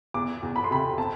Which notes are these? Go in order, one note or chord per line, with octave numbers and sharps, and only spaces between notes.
E2 D6
E2
B5
C6
C3 B5
C4 A5